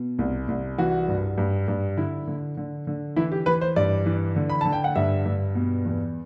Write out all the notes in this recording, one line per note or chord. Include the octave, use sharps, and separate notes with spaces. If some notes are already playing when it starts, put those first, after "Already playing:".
Already playing: B2
C2
C2
E3 F#4
G2
G2
G2
D3 E4
D3
D3
D3
E3 E4
G4
E3 B4
C5
G2 D5
E3
D3
B5
D3 A5
G5
F#5
G2 E5
G2
B2
E2